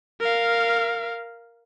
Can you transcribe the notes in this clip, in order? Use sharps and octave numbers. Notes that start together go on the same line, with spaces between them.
A#4 F5